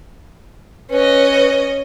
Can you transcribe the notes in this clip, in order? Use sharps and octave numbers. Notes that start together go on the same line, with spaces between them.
C#4 B4 D#5